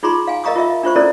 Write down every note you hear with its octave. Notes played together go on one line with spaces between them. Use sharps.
D#4 F4 G#4 A#5 C6 C#6
F5 G#5
A#4 D#5 F5 A#5 C#6 D#6
F4 A#4 D#5 E5
D4 F4 C5 C#6
C#4 E4 A4 A#4 D5